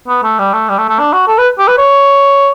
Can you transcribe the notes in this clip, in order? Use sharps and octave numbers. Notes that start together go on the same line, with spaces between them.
B3
A3
G3
A3
G3
A3
A3
D4
F#4
A4
B4
G4
B4
C#5